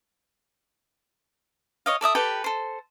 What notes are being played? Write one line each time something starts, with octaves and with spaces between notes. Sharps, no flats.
C#5 D#5 F5
A4 D5 E5 D#6
G4 A4 B4 G5
A4 C5